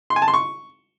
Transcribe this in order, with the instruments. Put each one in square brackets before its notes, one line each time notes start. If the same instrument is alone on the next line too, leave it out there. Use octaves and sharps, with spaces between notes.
[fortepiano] C6
G#5
A5
C6
C#6